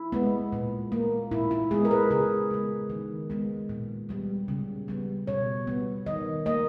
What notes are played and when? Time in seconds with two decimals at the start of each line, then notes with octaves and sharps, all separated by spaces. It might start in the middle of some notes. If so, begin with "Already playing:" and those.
Already playing: E4
0.12 G#3 B3
0.52 A#2
0.92 A#3
1.31 A#2 E4
1.51 E4
1.71 G#3 B3 G#4
1.85 A#4
1.91 B4
2.10 C#3 G#4
2.50 G#3 B3
2.90 D#3
3.30 G#3 B3
3.69 A#2
4.09 G3 B3
4.48 C#3
4.88 G3 B3
5.27 B2 C#5
5.67 G3 B3
6.06 D#3 D#5
6.46 A#3 D#5